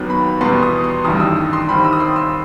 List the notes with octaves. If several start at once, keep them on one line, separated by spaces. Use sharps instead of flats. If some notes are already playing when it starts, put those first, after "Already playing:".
Already playing: D#2 D#3 F#3 B3
B5
E2 B2 G3 B3 C6
D#6
C6
A1 G2 D#3 G3 D#6
D#6
E6
D#6
C6
D#2 D#3 G3 C4 B5
E6
D#6
C6
E6